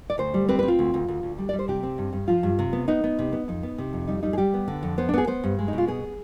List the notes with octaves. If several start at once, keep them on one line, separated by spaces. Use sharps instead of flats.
D5
D2 C5
G3
C4 B4
C4 B4
F4
D2
D2
D2
D2
G3
D5
G3
C5
C3 G4
C4
G2
G2
F3 F4
G2
C3
B3
B3 D#4
B3
C3
B3
F2 D#4
B3
C3
F2
G3 D#4
G3 D#4
G#4
G3 G4
B3
D3
F2
B3 C5
D4
B3 G#4
B3 C5
G2
G#3
D#4
B2
F4
B3 G#4
B3